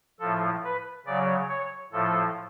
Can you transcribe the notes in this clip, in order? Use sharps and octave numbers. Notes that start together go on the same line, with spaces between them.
A2 F3 A4
B4
C#3 F#3 D5
C#5
A2 F3 A4